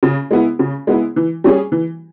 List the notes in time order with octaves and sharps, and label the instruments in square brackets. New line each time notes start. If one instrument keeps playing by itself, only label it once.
[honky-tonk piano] C#3
G#3 B3 E4
C#3
G#3 B3 E4
E3
G3 C#4 G#4
E3